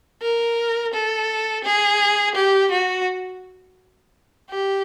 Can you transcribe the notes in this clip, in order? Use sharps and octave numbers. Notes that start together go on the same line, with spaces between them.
A#4
A4
G#4
G4
F#4
G4